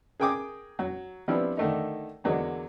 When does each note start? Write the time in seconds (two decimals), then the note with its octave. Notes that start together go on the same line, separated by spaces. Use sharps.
0.20 G#4 A#4 G5 G#5 D6 D#6
0.79 F#3
1.28 F3 G3 B3 C4 D4 E4
1.57 D3 D#3 A3 A#3 D#4
2.24 E2 D3 F#3 G#3 A#3